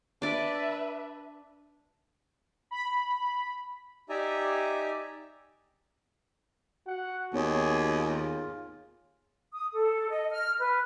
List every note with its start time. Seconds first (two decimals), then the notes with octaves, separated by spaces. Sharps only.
0.22 D4 B4 D5 E5
2.71 B5
4.09 D#4 G4 D5 E5 G#5 A#5
6.88 F#4 F#5
7.34 D#2 B3 D#4 G#4 C#5
7.98 F4 G#4
9.53 D#6
9.73 A4
10.09 D#5
10.31 F6
10.59 B4